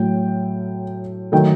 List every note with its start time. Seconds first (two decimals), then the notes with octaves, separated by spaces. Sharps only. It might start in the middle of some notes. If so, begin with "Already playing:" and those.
Already playing: A2 F#3 A3 G5
1.32 D#3 F#3 A3 G5